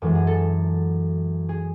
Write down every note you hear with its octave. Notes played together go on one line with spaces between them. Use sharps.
F#2 E3 G#3 A4
G#4
A4
G#4